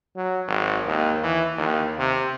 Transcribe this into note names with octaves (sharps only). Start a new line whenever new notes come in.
F#3
G#1
D#2
E3
D#2
C3